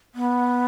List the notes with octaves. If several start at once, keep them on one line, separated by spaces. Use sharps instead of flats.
B3